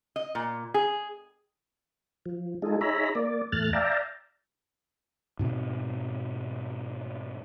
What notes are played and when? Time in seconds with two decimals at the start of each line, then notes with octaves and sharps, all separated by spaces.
0.16 D#5
0.35 A#2
0.74 G#4
2.26 F3
2.62 G#3 D#4 F4 G#4 A4
2.81 D#4 G#4 C#5 E5 A#5 B5
3.15 A#3 D5
3.52 E2 A2 A3 F6 F#6 A6
3.73 D5 E5 F5 G5 A5 A#5
5.39 G#2 B2 C4